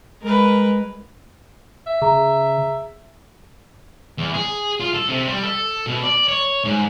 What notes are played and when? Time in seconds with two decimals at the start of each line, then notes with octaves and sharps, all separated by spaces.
0.22 G#3 A#4 B4
1.87 E5
2.02 C#3 G#4 A#5
4.18 E2
4.34 G#4
4.80 F4
4.94 A4
5.08 C3
5.27 G3
5.43 A4
5.87 B2
6.03 D5
6.28 C#5
6.64 G#2